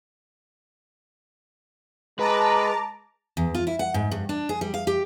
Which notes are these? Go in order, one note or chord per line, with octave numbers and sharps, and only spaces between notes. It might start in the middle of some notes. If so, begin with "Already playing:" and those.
G#3 B4 A5 A#5 D6
E2
F4
E4
F#5
G#2
G2
D4
G#4
G3
F5
G4